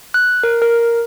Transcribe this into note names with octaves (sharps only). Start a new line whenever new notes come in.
F#6
A#4
A#4